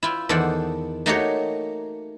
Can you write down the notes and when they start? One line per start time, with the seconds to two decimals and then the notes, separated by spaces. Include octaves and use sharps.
0.03 E4 F4 G5
0.29 E2 D#3 A4 C5 D5 F#5
1.06 A3 A#3 D#4 F#4 G4 C#5